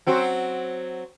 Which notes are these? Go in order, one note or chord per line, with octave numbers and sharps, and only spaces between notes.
F#3 C4 F#4